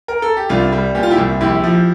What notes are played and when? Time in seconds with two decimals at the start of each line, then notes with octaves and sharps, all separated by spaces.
0.08 A#4
0.22 A4
0.37 G4
0.49 C2 D4 F4
0.72 G3
0.95 A#2 G4
1.03 F4
1.11 E4 G4
1.18 C2
1.41 A#1 E4 G4
1.64 F3